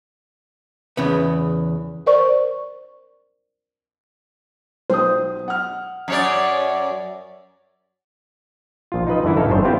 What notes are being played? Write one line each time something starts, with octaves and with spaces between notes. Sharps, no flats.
E2 C#3 B3
A#4 C5 D5 C#6
B1 C5 D#6
F#5 F6
F#2 C#5 D5
A#1 F4
D#4 F4 B4 D#5
F#2 D3 E3 E4
D2 A2 D#4 A4 F5
G1 F#2 D#3 D4 C5 C#5
B3 C4 E4 F4 G4 F5